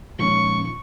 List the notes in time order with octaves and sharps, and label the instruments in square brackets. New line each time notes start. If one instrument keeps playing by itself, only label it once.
[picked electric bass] A#2 D#3 F3 [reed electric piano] G#3 C#4 [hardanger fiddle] C#6